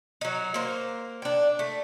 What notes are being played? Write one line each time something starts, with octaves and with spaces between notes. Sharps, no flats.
F#3 D#4
A#3 C5
D4 G5
A3